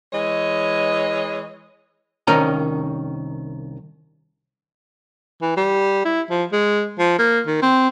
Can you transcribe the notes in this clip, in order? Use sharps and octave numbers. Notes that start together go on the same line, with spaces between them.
E3 G#3 C#5 D#5
C2 D#3 C#4 A#4 D#5 A#5
E3
G3
E4
F3
G#3
F3
A#3
D#3
C4